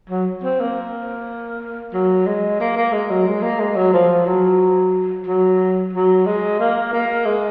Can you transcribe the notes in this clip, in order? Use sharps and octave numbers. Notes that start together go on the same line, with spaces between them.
F#3
C4
A#3
F#3
G#3
A#3
A#3
G#3
F#3
G#3
A#3
G#3
F#3
F3
F#3
F#3
F#3
G#3
A#3
A#3
G#3